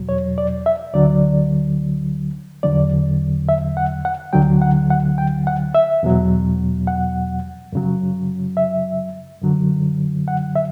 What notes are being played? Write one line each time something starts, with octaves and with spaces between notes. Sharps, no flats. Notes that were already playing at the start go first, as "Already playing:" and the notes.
Already playing: E2 B2 F#3
C#5
D5
E5
D2 D3 F#3 D5
E2 D3 F#3 D5
E5
F#5
F#5
D2 D3 F#3 G5
F#5
F#5
G5
F#5
E5
E2 B2 F#3
F#5
F#2 C#3 F#3
E5
F#2 D3 F#3
F#5
E5